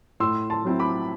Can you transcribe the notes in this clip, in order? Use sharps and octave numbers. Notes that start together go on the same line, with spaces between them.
A2 C6 E6
A5 C6
F#3 C4 E4
B5 D6